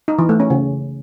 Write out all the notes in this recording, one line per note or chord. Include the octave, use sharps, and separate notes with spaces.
D#4
E3
A3
C#4
C#3